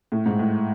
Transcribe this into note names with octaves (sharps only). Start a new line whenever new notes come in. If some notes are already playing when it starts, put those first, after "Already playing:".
A2
G#2
A2